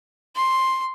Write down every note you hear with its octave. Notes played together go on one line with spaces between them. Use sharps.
C6